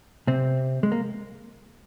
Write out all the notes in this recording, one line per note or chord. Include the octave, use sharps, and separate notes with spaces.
C3 C4
G#3
A#3